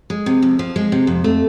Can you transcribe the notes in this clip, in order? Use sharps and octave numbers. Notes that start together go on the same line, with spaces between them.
G#3
C3
F2
F3
G#3
C3
F2
A3